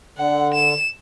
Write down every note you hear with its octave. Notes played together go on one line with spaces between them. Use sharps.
D3 F#5
E7